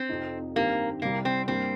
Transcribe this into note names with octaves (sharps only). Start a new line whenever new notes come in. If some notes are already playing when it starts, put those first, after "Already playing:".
Already playing: C4
F1 F2 F3 D#4
G2 D#3 A#3 C4 G4
C2 C3 G3 A#3
C4
G2 G3 A#3 C4